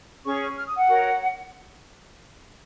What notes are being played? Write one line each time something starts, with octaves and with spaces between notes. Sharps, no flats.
C#4 G#4 C#5 C#6
F6
D#6
F#5
F#4 A#4 C#5